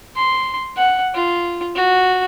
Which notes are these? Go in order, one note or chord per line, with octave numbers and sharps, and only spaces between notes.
C6
F#5
F4
F#4